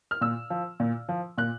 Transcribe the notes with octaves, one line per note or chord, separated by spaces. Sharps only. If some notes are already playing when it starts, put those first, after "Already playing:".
F6
A#2 E6
F3
A#2
F3
A#2 F#6